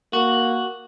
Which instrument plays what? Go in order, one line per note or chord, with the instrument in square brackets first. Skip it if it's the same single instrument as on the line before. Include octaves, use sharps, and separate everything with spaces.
[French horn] A#3 [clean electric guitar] F#4